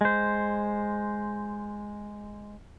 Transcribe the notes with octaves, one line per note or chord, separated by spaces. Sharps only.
G#3 C5